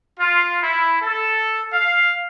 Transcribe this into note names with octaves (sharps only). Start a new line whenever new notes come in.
F4
E4
A4
F5